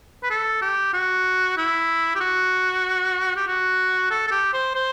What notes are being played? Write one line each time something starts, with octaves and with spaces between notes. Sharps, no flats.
B4
A4
G4
F#4
E4
G4
F#4
G4
F#4
A4
A4
G4
C5
C5